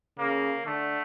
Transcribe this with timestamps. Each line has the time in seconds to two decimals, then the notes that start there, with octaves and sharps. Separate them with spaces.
0.18 C#3 A#3
0.66 D3 A3